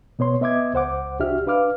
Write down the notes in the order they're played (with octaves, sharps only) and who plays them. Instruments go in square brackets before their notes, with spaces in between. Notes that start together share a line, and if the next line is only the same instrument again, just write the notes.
[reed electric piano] B2 B3 C#5 C6
B3 D#5 E5 D6 G#6
C#2 C5 F#5 D6
C2 D4 F#4 G4 E5 F6
D4 B4 F5 D6 F6